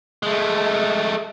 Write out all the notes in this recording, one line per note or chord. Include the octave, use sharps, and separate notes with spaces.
G#3 A3